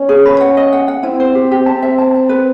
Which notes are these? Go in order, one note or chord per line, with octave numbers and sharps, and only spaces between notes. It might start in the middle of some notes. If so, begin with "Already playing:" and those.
Already playing: C#4
G#4
B4
F#5
D#5
F#5
F#5
C4 E4
C5
G4
G4
C4 A5
E5
A5
A5
B4